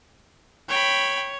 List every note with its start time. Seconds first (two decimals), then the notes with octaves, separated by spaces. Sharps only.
0.69 C#5 G5 B5